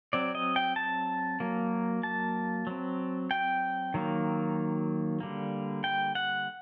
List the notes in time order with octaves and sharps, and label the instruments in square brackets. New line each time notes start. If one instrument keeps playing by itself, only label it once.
[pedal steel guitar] F#3 C4 D5
D#5
G5
A5
F#3 A#3
A5
F#3 C4
G5
D#3 F#3 A#3
D3 G3 A#3
G5
F#5